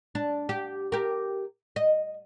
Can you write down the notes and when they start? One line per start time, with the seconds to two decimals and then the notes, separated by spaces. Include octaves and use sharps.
0.15 D4
0.49 G4
0.92 G4 A#4
1.76 D#5